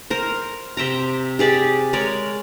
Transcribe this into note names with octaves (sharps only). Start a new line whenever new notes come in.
A#4 C5
C3 E5 G5 A#5
G4 G#4 D5 E5
G#3 A#4 C#5 D5